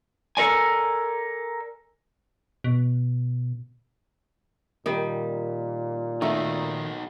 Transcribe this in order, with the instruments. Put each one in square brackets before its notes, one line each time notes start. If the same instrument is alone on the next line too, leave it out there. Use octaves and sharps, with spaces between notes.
[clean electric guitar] A4 A#4 D5 G#5
[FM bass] B2
[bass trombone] A#2 [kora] D#3 G3
[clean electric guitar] D#3 [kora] A3 [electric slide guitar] D#4 F#4